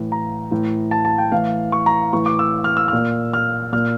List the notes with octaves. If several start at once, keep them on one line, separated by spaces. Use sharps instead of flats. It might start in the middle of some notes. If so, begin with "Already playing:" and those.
Already playing: A2 E3
A#5
A2 E3
A5
A5
G5
A2 E3 F5
C#6
A#5
A2 E3 C#6
D6
E6
F6
E6
A#2 F6
F6
A#2 F6